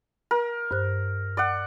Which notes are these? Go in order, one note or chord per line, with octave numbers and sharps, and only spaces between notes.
A#4
G2 C5 F#6
D5 F#5